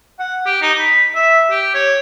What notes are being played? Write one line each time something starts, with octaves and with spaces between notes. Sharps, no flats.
F#5
G4
D#4
B5
E5
G4
C#5